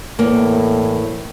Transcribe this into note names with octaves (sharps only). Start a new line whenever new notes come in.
E2 A2 A#3